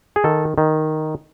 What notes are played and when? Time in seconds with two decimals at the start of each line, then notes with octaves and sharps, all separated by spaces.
0.16 G#4
0.24 D#3 A4
0.58 D#3